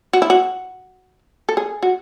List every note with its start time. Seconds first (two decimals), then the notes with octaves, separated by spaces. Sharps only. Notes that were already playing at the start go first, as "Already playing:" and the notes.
0.13 F#4
0.22 E4
0.30 F#4
1.49 A4
1.57 G#4
1.83 F#4